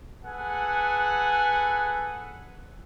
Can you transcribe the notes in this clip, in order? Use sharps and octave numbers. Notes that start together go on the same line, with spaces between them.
G#4 A4 B4 F#5 G#5